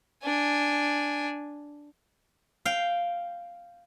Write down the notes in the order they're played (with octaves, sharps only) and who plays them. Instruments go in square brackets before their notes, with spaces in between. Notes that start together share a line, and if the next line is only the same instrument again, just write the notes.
[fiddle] D4 G#5
[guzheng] F5 G5